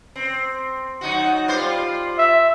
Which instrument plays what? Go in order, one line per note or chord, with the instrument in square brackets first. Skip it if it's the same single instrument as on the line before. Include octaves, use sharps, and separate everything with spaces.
[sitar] C4
F#3 D#4 F#4
G3 F4 C5
[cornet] E5